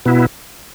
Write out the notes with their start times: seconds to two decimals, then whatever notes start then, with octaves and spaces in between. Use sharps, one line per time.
0.05 B2 B3 E4